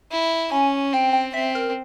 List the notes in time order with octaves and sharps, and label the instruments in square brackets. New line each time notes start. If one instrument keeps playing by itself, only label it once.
[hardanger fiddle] E4
[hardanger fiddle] C#4 [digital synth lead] G#5
[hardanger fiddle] C4 [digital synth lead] G5
[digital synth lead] G5
[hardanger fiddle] C4 [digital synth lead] E5
[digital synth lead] A#4